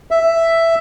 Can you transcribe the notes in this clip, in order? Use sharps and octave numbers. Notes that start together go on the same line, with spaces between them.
E5